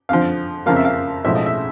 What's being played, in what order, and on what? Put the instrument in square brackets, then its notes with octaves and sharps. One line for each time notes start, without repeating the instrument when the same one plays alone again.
[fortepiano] F2 D3 F3 F5
F2 C#3 F3 A#3 F5
E5
F5
B1 A2 F3 G#3 E5
D#5
E5